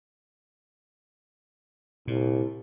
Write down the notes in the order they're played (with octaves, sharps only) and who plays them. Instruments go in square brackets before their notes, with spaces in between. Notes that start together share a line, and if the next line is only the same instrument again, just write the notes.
[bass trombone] C2 [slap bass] A#2